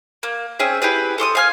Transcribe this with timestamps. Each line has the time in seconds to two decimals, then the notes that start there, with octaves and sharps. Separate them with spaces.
0.23 A#3
0.59 C4 C#4 G#4 E5
0.82 E4 G4 G#4 B4
1.18 A4 C6 D6 D#6
1.35 F5 G#5 F6